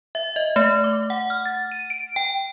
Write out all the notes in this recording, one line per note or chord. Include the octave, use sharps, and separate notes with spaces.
E5
D#5
A3
D6
F#5
F6
A6
D#7
D7
G5